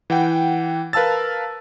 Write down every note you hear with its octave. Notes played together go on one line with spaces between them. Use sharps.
E3 F#5 G5
A#4 B4 F5 A5 E6 A6